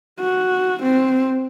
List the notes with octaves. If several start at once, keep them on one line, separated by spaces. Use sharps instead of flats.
F#4
C4